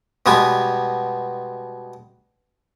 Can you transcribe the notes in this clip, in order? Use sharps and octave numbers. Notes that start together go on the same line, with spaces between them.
B2 G3 G#3 B3 G#5